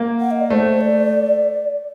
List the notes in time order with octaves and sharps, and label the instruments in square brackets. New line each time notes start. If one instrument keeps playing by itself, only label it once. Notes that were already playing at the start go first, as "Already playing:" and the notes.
Already playing: [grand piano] A#3
[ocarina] F#5
D#5
D5
[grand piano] A3 [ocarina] C5
[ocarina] D5